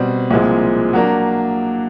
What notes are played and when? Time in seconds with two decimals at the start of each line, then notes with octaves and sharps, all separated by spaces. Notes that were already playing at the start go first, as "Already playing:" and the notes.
Already playing: B2 G3 C4
0.31 C2 A#2 F3 G#3 C4
0.93 F#3 A#3 D4